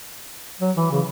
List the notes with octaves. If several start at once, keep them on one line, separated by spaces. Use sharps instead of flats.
F#3
E3
C#3